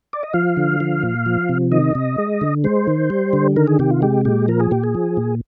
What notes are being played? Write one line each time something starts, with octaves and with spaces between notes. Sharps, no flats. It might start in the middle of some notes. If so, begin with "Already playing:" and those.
D5
D#5
F3 F5
D3
F3
A#2
F3
C3
D#3 D#5
C3
G#3
D3
G#3 C5
D#3
G3
D3
D#3 A#4
G#4
C3 G4
F4
G#3 G4
A#2 G4
F3 A#4
G#4
A#2 G4
G#4
F3
A#2